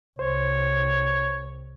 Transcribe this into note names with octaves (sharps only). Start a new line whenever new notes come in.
C2 C5 C#5